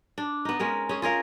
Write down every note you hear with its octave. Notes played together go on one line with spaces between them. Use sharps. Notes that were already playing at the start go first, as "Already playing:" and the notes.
D4
B3 D#4
G#3 C#4 A#4
C#4 G#4
F4 G#4 A#4 F5